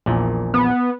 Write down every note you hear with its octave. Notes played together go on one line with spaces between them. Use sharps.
A#1 E2 A#2
B3